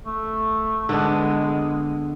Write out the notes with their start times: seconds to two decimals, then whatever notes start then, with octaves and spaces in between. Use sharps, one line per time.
0.06 A3
0.89 D3 G#3 B3 D4